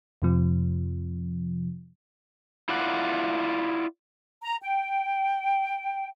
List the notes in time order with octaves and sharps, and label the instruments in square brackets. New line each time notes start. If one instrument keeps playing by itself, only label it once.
[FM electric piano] F2 C3 F3
[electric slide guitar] E4 F4 D5 F#5
[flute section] A#5
G5